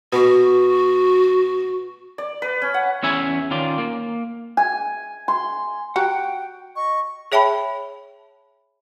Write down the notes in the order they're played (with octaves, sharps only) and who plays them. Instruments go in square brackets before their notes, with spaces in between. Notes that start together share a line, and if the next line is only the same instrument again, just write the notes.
[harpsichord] B2 [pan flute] F#4
[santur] D5
B4
C#4
F#5
[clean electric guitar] E2 C#4 E5 G#5
D#3 C#4 F4 D5
A#3
[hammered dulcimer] G#5
C6
[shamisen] F#4 G4 A#5 [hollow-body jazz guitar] F#5 [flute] G5
[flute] D#5 [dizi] C#6
[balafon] G#4 C#5 E5 G5 A5 B5